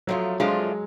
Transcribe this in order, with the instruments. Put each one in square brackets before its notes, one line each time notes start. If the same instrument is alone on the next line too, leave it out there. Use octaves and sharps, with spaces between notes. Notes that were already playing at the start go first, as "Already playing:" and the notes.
[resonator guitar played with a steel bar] F2 F3 A3 D4 F4 [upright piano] F#3
[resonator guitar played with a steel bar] F2 F3 A3 D4 F4 [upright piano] G#3